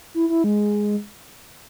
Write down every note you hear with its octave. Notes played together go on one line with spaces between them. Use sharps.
E4
E4
G#3